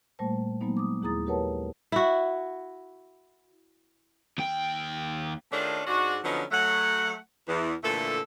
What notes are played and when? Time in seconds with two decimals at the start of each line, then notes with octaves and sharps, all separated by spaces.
0.19 A#2 G3 A3 A#3 C5 A5
0.61 F#3 G#3 A#3 B3 D#4
0.77 D6 D#6
1.02 D#2 E4 G#4 A#5 D#6 A6
1.26 G4 A#4 B4 C#5 F#5 A5
1.92 E4 F#4
4.38 D#2 G5
5.52 D#3 A3 C#4 D4 F4 G#4
5.87 G#2 G#3 D4 F#4
6.24 D3 F3 F#3 B3 C#4 D#4
6.52 F#3 A3 F#5
7.48 E2
7.84 A#2 D3 E3 A3 A4